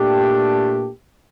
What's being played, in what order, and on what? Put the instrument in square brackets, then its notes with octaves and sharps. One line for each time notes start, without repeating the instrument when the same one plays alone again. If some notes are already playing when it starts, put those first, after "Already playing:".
Already playing: [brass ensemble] A#2 A3 D4 G4